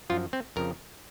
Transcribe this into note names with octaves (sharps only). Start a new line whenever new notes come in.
F#2 F3 F4
C4
F2 C#3 F3 A#4